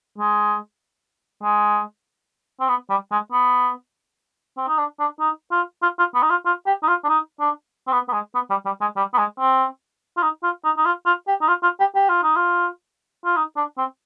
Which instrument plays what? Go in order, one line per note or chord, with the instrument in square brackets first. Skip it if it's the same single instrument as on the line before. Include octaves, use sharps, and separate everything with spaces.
[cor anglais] G#3
G#3
C4
B3
G3
G#3
B3
C4
D#4
D4
D4
D#4
F4
F4
F4
B3
D#4
F4
F4
G4
D#4
F4
D4
D#4
D4
C4
B3
B3
G#3
B3
G3
G3
G#3
G3
B3
G#3
C4
F4
D#4
F4
D#4
D#4
F4
F4
G4
D#4
F4
F4
G4
G4
F4
D#4
F4
F4
D#4
D4
C4